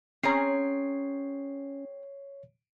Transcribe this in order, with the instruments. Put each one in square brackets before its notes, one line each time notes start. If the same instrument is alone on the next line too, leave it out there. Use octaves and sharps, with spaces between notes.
[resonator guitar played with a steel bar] C4 G#4 A#5 [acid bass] C#4 [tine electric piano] C#5 C7